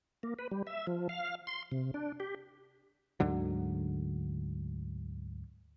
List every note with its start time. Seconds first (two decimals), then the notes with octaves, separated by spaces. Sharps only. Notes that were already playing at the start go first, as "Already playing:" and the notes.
0.23 A#3
0.39 B4
0.51 G3
0.67 E5
0.87 F3
1.09 F5
1.47 C6
1.71 C3
1.94 D4
2.20 G4
3.20 D2 G#2 D3 F#3